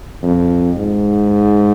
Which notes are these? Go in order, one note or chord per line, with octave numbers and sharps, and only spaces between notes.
F2
G#2